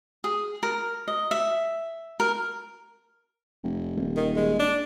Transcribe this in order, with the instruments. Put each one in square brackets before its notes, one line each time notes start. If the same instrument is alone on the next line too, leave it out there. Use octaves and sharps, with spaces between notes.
[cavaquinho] G#4
A#4
D#5
E5
A#4
[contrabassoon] F1
D#1
[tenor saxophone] D#3
G#3
D4